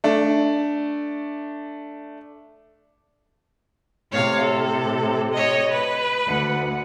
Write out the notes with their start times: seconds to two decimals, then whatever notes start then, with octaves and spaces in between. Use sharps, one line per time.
0.04 A3 D4
4.12 A2 C3 C#5 F5
4.42 A4
5.33 C#5 D#5
5.71 B4
6.26 D2 F#5